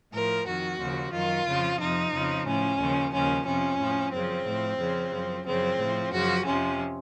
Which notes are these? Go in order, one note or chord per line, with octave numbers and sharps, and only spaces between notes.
A2 F3 A#4
F2 D#3 F#4
D#2 C#3 F3
F#2 D#3 F4
F2 C#3 F3
F2 C3 F3 D#4
F2 C#3 F3
A2 F3 C#4
D#2 C#3 F3
D#2 C#3 F3 C#4
F2 C3 F3 C#4
A2 F3
F#2 C#3 F3 C4
A2 F3
F2 C#3 F3
F#2 F3
F#2 C#3 F3 C4
A2 F3
F#2 C#3 F3 F#4
F2 C3 F3 C#4